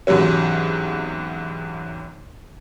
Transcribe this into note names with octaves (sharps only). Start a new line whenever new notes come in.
E2 G#2 C3 F#3 C#4